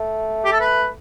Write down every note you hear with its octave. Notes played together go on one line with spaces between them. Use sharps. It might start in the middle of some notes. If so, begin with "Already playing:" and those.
Already playing: A3
G4
A4
B4